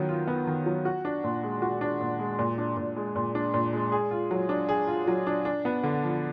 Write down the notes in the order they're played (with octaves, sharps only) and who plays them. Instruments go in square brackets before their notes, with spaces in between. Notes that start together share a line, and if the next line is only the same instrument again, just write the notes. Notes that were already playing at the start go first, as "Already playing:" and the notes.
Already playing: [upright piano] D#3 F#3 B3
F4
B3
D#3
F#3
F#4
D4
A#2
G#3
F#4
D4
A#2
G#3
A#2
D4
A#2
G#3
A#2
D4
A#2
G#3
G#4
F4
F#3
D4
G#4
F4
F#3
D4
D4
B3
D3
F3